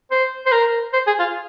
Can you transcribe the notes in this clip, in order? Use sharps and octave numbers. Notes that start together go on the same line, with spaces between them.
C5
C5
A#4
C5
G#4
F4